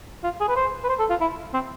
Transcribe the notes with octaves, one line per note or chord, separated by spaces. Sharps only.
F4
G#4
B4
C5
B4
C5
A4
F4
E4
C4